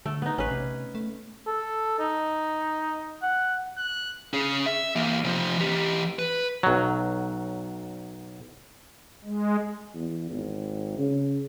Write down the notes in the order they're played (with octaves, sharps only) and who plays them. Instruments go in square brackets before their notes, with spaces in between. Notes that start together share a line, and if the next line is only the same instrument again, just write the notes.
[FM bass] D3 [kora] A3
[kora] B3 D#4
[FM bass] A1 [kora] C#4 B4
[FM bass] C3
A3
[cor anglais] A4
D#4
F#5
[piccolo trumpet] F#6
[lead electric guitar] C#4 G#4
E5
E3 A#3
C3 F3
E3 G4
B4
[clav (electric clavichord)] B1 F#3
[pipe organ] G#3
[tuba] E2
G#1
C#3